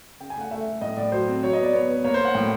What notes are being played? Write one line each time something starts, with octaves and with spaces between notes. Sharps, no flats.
C#3 G5
G#5
A3
F#5
A3 E5
A3
A2 D#5
A2 D5
F#3 C5
C4
F#3 C#5
D#5
B3 D5
B3 C#5
B3
A#3 C#5
C5
A#3
F#5
A2 G5